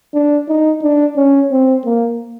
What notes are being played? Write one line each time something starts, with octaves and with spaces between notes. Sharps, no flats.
D4
D#4
D4
C#4
C4
A#3